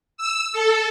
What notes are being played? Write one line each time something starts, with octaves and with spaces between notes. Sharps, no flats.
E6
A4